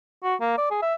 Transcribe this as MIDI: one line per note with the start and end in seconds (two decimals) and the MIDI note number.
0.24 0.35 66
0.41 0.54 58
0.58 0.68 74
0.71 0.82 68
0.82 0.94 76